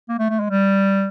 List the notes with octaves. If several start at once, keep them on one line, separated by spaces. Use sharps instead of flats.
A#3
A3
A3
G#3
G3